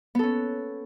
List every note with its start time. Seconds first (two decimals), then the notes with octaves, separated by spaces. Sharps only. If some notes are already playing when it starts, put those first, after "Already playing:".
0.15 B3
0.19 A4
0.23 C#4